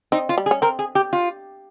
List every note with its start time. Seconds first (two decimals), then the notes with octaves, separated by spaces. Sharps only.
0.12 C4 D#4
0.29 F4
0.38 G3
0.46 G#4
0.51 C#4
0.62 C4 A#4
0.79 G#4
0.95 G4
1.13 F4